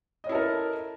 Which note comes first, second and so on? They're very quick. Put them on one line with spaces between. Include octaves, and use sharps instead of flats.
D#5 C#4 E4 A4 A#4